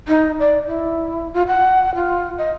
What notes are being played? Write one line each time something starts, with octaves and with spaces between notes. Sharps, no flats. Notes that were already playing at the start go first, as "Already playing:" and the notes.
D#4
D5
E4
F4
F#5
F4
D#5